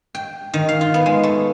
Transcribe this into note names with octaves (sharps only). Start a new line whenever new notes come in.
G5
D#3
F5
F4
B3
G#3
A3